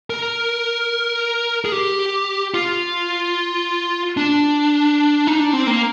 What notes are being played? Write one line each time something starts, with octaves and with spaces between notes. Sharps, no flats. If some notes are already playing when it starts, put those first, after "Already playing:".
A#4
G#4
G4
F4
D4
D#4
D4
C4
A#3